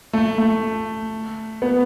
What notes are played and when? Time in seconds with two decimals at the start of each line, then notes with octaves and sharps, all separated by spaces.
0.13 A3
0.38 A3
1.62 B3